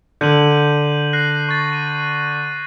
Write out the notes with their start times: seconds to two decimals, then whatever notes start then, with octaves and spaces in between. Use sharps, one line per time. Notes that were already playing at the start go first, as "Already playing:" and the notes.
0.21 D3 G6 D#7 F#7
1.13 F#6 A#6 C7
1.49 C#6 A6
1.73 D#7